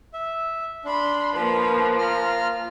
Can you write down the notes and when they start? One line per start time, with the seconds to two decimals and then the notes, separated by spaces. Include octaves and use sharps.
0.14 E5
0.85 D4 B5 C6
1.34 F3 A#3 B4
1.99 F4 A#5 F6